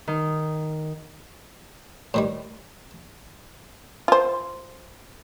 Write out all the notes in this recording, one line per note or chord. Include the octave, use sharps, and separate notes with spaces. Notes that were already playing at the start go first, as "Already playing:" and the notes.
D#3
A2 D#3 G3
F4 C5